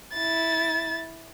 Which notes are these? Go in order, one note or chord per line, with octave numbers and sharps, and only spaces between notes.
E4 A6